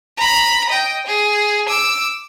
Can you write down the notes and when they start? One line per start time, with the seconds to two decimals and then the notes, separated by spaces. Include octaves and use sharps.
0.17 A#5 B5
0.69 D#5 G5
1.06 G#4
1.68 D6 E6